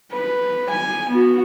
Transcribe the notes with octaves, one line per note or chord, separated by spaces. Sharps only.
B4
G#5
B3 F#4